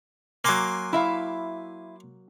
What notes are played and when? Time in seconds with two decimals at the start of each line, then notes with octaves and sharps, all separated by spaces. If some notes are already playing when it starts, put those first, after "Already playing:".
0.44 F#3 A#3 G#5 C6 D6
0.93 E4 E5 F5